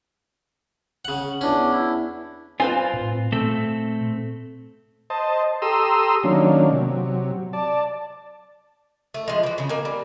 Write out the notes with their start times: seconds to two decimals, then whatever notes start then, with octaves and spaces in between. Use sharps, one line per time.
1.05 C#3 F#5
1.41 E2 C#4 D4
1.71 E4
2.60 C4 F4 B4 C5 G#5
2.94 A2
3.32 A#2 A3 C4 A4
5.10 C5 D#5 A5
5.62 G4 A4 A#5 C6 D#6 E6
6.23 D#3 F#3 A#3 C#4 D4
6.71 C3 F#3
7.53 D5 A5
9.14 A3
9.28 F3 G#3
9.43 E3 F#4
9.58 C#3 D#4
9.69 A#3 G#5
9.85 G3